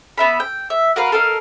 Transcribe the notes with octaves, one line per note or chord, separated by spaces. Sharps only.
B3 E5 B5
G5
E5
F#4 A#4 B4 F5
A4 A#4 D#5 F5